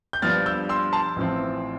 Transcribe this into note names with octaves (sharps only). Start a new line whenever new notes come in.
G6
G2 F3 B3 D4 F6 A6
E6 G6
C6 E6
A5 C6
A1 A2 F3 C4